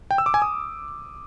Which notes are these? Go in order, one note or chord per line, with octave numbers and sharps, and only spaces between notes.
G5
E6
D6
G#5
D#6